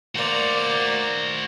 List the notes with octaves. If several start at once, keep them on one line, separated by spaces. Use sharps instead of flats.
A#3 F#4 C5 D5